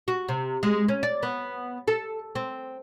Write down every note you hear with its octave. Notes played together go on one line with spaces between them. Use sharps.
F#4
C3
G#3
C#4
D5
B3
A4
C4